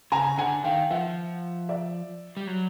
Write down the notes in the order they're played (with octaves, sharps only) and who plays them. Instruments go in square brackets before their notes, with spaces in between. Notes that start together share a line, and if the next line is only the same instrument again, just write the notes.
[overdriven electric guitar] C#3 [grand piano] G#5 A#5
[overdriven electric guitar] D3 [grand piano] F#5 G#5
[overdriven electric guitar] D#3 [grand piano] F5 G5
[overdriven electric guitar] F3 [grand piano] E5 F#5
[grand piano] D5 E5
[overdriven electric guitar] G3
F#3